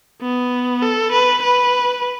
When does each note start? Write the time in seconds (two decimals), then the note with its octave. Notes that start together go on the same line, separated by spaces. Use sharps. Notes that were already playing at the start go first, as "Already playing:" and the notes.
0.22 B3
0.82 A4
1.13 B4
1.43 B4